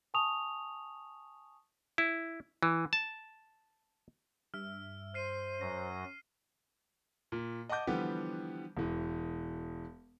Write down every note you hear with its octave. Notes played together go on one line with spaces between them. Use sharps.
G#5 A5 C#6 D#6 F7
E4
E3
A5
G2 E5 F6
C5 F6 C7 D#7
F#2 F#3 A#6
A#2
D#5 F#5 A5 D6 G6
D3 E3 F3 G3 B3 G4
E1 E3